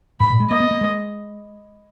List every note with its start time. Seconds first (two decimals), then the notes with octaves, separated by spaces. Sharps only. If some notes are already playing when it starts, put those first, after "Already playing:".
0.20 G#2 B5
0.30 A#2
0.40 G#3
0.50 A#3 D#5
0.60 B3
0.71 A#3
0.81 G#3